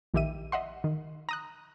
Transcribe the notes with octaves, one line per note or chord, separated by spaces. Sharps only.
A#1 D#3 D#4 G4 E5 D#7
D#5 E5 F#5 C6
D#3
A#5 D#6 F#6